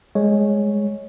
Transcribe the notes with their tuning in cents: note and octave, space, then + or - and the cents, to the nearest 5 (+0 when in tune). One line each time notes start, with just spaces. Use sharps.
G#3 +0 C#5 +0